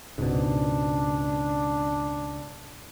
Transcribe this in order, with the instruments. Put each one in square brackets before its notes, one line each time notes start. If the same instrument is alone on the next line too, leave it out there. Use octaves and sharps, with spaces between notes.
[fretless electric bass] C#2 [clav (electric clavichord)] G#2 B2 [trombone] D4